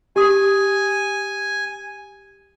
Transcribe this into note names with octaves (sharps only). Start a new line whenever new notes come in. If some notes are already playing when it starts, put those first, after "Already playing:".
G4 G#5 D#6